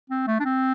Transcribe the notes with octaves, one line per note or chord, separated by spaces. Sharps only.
C4
A3
D4
C4